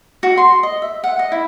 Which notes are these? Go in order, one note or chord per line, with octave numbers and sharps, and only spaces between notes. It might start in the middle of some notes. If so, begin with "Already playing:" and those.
F#4
C6
D#5
E5
F#5
D#5
E4